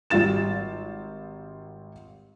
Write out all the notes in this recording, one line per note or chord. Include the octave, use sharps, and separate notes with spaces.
G#1 G3 F4 A6 E7